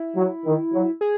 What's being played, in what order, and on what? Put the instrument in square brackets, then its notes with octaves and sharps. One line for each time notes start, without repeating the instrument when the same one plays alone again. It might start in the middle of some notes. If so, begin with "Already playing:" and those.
Already playing: [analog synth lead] E4
[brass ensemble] F#3
D#3
F#3
[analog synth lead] G#4